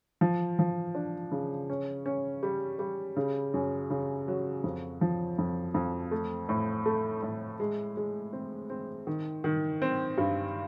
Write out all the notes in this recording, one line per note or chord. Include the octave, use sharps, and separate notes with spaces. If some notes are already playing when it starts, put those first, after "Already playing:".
F3
F3
D4
C#3
C#4
C#4
G3
G3
C#3
F#2
C#3
F#3
F2
F3
F2
F2
A3
A2
A3
A2
G#3
G#3
C4
C4
D#3
D#3
C4
G2